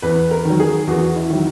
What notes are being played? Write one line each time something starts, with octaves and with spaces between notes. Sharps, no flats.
E2 B4
A#4
D#3
F#3
G#4
E2 F#4
E4
D#3 F#3